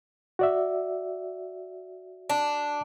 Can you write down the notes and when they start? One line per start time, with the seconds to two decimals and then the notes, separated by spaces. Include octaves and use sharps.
0.39 F#4 D5 E5
2.30 D4